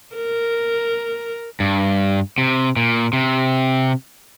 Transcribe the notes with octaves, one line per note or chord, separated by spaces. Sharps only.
A#4
G2
C3
A#2
C3